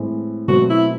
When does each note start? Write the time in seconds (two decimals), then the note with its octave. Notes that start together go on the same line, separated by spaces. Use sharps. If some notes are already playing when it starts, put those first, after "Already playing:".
Already playing: A2 E3 G#3 C4
0.48 B2 F#3 A3 C4 F#4
0.70 E4